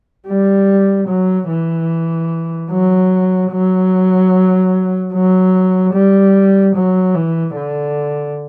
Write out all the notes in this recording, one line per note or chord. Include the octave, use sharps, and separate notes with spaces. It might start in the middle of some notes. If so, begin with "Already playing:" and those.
G3
F#3
E3
F#3
F#3
F#3
G3
F#3
E3
D3